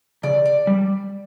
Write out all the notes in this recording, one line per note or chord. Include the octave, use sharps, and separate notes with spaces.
C#3 D5
D5
G3